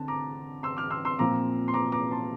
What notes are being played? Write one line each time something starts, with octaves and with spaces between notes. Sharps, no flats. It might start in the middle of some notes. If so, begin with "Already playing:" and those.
Already playing: D3 C4 A5
A#5 D6
C6 E6
D6 F6
C6 E6
C6 E6
A#2 F3 C4 F4 A#5 D6
C6
A#5 D6
A#5 D6
A5 C6